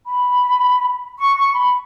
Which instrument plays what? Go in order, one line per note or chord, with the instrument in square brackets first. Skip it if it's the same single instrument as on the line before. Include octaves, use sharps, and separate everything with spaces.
[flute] B5
C#6
C#6
B5